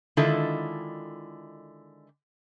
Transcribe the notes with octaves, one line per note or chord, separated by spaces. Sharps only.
D3 D#3 G#3 E4 F4 A4